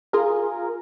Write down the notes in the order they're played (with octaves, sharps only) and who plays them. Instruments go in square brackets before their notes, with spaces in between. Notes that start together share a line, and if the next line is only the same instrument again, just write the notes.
[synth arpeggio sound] F4 G#4 A#4